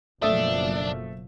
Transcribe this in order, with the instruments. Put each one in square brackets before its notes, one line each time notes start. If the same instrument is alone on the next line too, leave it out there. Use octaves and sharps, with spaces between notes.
[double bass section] F#1 B2 F3 [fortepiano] A3 A4 D#6 [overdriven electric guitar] D4 [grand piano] E5